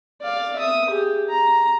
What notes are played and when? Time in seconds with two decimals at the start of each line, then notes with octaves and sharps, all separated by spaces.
0.22 D5 F5
0.56 E5 D#6
0.89 G4 G#4
1.29 A#5